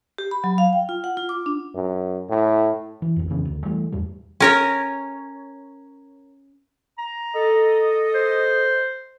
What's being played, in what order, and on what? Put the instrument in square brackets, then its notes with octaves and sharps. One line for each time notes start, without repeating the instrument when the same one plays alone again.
[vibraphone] G4
B5
F#3
F5
G5
F4
F#5
F4
D6
D4
[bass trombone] F#2
A2
[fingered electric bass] E3
A1 F2
F2 C#3 E3 B3
D2
E3 G3 A3
E2 A2 G3
[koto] C#4 A#4 C#5
[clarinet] A#5
[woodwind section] A4 D#5
[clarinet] C5